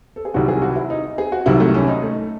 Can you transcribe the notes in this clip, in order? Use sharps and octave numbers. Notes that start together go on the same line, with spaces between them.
A4
G#4
C2 C3 D#3 F#3 F#4
G#4
F#4
E4
D#4
G#4
F#4
C2 C3 D#3 F#3 E4
A3
C#4
D#4
A3